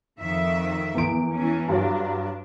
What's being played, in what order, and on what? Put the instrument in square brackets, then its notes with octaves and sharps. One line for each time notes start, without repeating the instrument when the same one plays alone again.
[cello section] F2 D#3 E5
[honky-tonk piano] E2 D7
[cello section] E3 C#4
[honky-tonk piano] G2 F#3 [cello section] D4